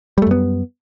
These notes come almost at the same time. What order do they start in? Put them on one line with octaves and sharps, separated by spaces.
G3 A3 F#2 B3